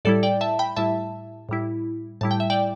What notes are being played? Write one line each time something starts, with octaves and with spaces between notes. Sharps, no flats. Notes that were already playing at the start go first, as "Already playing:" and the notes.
A2 G3 E4 A4 D5
D5 G5
E5 A5
G5 B5
A2 G3 E4 E5 A5
A2 G3 E4
A2 G3 E4 A5
G5
E5
D5 G5